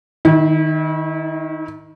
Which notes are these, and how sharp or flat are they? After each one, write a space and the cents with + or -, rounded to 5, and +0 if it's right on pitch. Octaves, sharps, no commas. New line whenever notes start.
D#3 +0 E4 -35